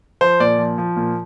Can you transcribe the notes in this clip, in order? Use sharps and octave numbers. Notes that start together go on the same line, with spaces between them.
F3 C5
A#2 D5
F3
F3
A#2